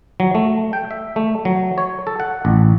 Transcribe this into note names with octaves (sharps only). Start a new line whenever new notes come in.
F#3
A3
G5
E5
A3
F#3
C#5
A4
F#5
A1